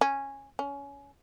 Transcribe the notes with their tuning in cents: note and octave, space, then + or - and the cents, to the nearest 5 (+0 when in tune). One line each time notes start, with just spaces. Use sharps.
C#4 -10
C#4 +20